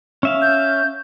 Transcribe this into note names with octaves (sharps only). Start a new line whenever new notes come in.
C#4 E5 F5
G6